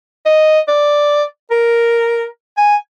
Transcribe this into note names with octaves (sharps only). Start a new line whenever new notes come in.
D#5
D5
A#4
G#5